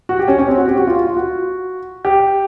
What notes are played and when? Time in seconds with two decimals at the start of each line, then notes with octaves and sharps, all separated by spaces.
0.09 F#4
0.19 G4
0.28 C#4
0.38 C#4
0.48 C4
0.58 F#4
0.68 G4
0.77 F#4
0.87 F4
1.07 F4
1.17 F#4
2.05 G4